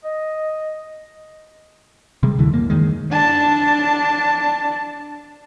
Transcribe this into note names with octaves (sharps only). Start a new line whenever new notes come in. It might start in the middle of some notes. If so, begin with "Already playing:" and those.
D#5
C3 G3 G#3
D2 D3 E3
F#2 A#3
F#2 D#3 G#3
D4 A5